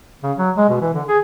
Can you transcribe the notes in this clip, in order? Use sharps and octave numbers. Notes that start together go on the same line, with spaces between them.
C#3
F#3
G#3
B2
E3
D3
G#4